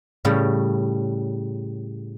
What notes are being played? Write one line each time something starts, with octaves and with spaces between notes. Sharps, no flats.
A2 C#3 G3